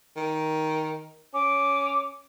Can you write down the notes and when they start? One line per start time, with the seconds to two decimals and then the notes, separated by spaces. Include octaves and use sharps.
0.17 D#3
1.34 C#4 D6